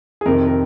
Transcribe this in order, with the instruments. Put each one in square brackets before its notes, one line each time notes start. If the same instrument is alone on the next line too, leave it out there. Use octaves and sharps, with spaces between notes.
[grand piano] G#4
F2 C3 D#3 A#4
A#4